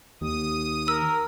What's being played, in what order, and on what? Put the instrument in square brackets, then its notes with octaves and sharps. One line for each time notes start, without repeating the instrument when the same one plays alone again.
[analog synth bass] D#2 [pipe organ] D#6
[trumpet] A#4 [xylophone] E6